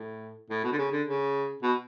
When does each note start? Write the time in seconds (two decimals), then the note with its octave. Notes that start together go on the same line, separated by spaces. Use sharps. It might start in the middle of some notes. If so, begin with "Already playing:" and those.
Already playing: A2
0.50 A2
0.64 B2
0.72 D3
0.79 C#3
0.92 D3
1.07 C#3
1.63 B2